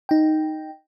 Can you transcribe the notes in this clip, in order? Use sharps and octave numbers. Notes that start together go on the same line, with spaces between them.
D#4 G5